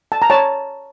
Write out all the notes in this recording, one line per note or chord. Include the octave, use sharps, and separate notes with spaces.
A5
A#5
C#5 A5